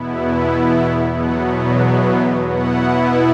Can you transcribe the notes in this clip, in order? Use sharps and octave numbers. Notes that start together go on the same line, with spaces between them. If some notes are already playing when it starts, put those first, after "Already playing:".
Already playing: E2 B2 B3 E4
F#5
E2 B2 F#3 B3 F#5
E5
B2 B3 E4 F#5